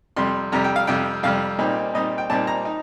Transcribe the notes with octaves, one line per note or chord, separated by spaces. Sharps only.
F2 C3 G3 C6
F2 C3 G3 A#5
G5
F5
F2 C3 G3 G5
F2 C3 G3 F5
A#2 G3 C4 D#4
A#2 G3 C4 D#4 D#5
G5
A#2 G3 C4 D#4 A5
A#5
D#4